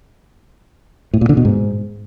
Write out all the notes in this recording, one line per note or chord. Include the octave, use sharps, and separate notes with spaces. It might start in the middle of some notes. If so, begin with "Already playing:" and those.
A2
A#2
D3
B2
G#2